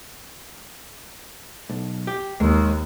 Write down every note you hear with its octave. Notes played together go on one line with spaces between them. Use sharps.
B1
G4
D#2 G#3 A#3